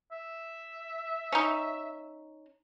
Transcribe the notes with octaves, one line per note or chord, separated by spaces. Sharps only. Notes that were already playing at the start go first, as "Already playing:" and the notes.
E5
C#4 D#4